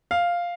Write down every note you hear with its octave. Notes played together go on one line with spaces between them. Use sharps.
F5